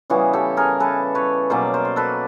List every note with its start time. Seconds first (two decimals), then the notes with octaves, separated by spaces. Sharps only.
0.10 C#3 E3 G3 B3 F#4 G#4
0.33 G4 A4
0.57 G#4 A#4
0.80 A4 B4
1.15 B4 C#5
1.50 B2 F#3 A#3 C#4 C5 D5
1.74 A#4 C5
1.85 C5
1.96 A4 B4